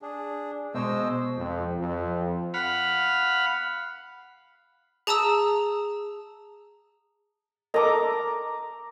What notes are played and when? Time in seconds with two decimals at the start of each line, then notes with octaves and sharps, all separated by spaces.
0.02 D4 G#4
0.75 B2 G#3 C5 D#5 E6
1.36 F2
1.79 F2
2.54 F5 F#5 B5
5.07 G#4 A5 A#5 D#6 E6
7.74 A4 A#4 D#5 A#5 D6